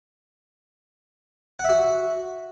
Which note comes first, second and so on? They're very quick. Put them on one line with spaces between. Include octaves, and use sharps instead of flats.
F#5 E5 F#4